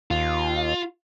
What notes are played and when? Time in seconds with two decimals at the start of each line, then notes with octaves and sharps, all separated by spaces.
0.11 D#2 F4